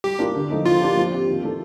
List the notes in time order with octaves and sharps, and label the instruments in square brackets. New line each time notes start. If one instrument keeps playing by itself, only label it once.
[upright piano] G3 [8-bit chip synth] G4
[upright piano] D4 F4 A#4
D3
F3 A3 D#4 A4
[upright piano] F3 [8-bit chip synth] F4
[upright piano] A#3 D4 G4
F3
C4 G4
D#3
A3 D4 A4